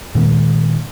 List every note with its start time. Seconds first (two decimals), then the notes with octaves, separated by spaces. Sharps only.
0.15 A#2 D#3 G#3 A#3